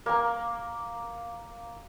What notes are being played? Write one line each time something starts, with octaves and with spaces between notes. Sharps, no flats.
A#3 A#5